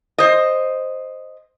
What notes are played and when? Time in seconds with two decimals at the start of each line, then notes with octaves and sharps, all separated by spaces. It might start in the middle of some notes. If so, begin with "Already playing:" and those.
0.18 C5 D#5